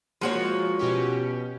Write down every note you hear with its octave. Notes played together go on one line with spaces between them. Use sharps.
F3 G#3 A#3 F4 F#4 C#5
B2 C#4 G4